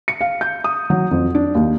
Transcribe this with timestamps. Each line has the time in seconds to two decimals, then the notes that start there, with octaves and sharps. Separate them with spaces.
0.08 C#7
0.21 F5
0.41 G6
0.64 D#6
0.90 F#3
1.11 F2
1.35 D4
1.55 D#2